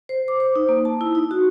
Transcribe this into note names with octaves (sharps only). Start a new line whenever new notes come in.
C5
D6
C5
D#4
A#3
A5
E4
D#4
F#4